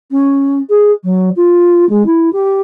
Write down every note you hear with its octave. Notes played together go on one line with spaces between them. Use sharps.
C#4
G#4
F#3
F4
G#3
E4
G4